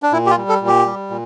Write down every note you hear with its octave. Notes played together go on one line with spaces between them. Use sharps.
D4
A#2 E4
G4
F4
G3
A4
A#2
G4
G3
A#2